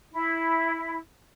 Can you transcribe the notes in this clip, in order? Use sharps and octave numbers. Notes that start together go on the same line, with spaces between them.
E4